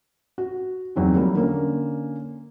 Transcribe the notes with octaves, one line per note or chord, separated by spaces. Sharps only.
F#4
E2 F#3 C4 D#4
F#3 G3 A#3
D3 A#3 C#4